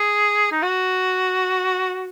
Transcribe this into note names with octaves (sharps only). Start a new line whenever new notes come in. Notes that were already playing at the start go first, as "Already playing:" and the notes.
Already playing: G#4
D#4
F#4